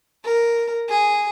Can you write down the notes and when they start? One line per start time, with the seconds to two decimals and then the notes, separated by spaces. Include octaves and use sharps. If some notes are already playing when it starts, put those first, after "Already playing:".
0.24 A#4
0.89 G#4